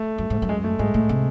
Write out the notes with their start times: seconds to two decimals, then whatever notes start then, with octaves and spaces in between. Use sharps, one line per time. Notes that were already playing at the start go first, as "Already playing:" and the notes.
Already playing: A3
0.18 F#2
0.30 G#2
0.42 F#2
0.49 G#3
0.64 A3
0.79 G#2 G#3
0.94 A2
1.09 C3